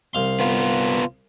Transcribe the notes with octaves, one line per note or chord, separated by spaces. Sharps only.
C2 F5 C6
B3 F4